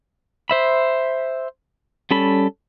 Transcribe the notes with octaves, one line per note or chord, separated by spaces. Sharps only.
C5 E5 B5
G3 C#4 A4 B5